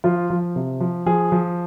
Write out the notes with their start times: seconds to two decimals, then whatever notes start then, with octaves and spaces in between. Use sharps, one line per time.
0.04 F3 F4
0.30 F3
0.56 C3
0.80 F3
1.06 F3 G#4
1.32 F3